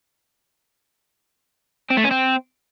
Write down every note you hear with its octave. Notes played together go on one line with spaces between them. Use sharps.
C4
A3
C#4
C4